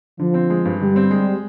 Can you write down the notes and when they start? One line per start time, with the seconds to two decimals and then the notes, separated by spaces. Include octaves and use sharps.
0.19 D3 F3
0.34 C4
0.50 G#3
0.65 G2
0.80 D3 G3
0.96 C4
1.11 G#3